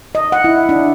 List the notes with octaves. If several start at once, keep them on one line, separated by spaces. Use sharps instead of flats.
D#5
F#5
E4
D4